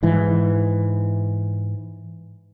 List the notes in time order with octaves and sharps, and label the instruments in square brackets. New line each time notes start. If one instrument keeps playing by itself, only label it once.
[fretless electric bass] G#2 E3